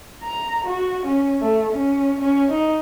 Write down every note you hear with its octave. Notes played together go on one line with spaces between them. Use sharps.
A#5
F#4
C#4
A3
C#4
C#4
D#4